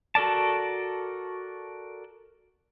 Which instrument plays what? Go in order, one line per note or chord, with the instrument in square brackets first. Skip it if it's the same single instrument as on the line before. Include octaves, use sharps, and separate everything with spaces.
[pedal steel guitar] F#4 A4 A#4 D5 A5